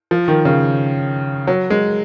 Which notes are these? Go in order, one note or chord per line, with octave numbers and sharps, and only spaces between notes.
F3
D#3
C#3
F#3
G#3